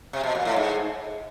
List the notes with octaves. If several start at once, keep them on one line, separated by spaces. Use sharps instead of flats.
C3
B2
A#2
A2
G#2